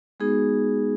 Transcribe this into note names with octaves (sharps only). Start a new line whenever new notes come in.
G#3 B3 D#4 F#4 G#4